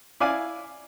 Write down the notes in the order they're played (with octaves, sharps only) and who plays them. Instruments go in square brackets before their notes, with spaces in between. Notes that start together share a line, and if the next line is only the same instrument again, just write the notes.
[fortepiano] E4 D5 F5 G#5